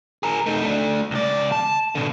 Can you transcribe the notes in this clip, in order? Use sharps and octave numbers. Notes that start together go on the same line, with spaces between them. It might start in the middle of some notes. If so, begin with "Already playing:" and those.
G#4 A#4
A3 D#4
A3 D4
C#2 D5
A5
B2 D3